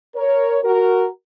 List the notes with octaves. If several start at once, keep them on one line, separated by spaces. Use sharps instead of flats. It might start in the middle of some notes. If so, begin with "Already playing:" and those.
A#4 C#5
F#4 A#4